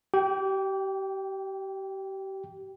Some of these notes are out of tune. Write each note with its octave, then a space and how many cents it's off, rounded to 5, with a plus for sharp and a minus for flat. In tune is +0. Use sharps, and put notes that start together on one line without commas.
G4 -30 G5 +0